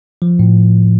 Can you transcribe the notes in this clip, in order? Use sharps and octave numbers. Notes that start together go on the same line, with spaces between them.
F3
A2